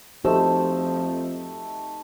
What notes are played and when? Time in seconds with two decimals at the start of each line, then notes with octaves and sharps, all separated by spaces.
0.25 F2 F3 A3 D#4 F#4 G4 C5 E6